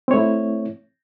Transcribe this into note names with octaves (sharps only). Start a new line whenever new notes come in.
A3 C4 E4 C#5